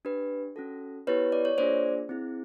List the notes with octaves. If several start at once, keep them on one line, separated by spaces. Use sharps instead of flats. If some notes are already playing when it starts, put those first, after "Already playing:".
D4 G4 B4
C#4 F#4 A4
B3 E4 G4 B4 C#5
D5
C#5
A#3 D4 F4 G#4 C5 D5
C4 E4 G#4